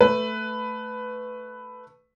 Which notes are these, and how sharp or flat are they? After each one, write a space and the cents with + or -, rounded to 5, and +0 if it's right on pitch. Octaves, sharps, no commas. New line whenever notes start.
A3 +0 B4 +10